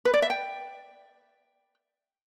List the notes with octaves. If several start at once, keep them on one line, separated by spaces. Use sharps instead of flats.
B4
D5
E5
G5